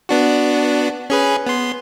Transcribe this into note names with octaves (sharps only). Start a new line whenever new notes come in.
B3 D4 F#4
C#4 G#4 B4
B3 C6